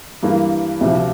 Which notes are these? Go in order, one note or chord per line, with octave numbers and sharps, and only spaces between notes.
G2 E3 A#3
D2 C3 F3